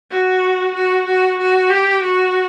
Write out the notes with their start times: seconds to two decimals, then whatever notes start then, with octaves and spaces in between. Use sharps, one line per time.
0.11 F#4
0.75 F#4
1.07 F#4
1.39 F#4
1.70 G4
2.02 F#4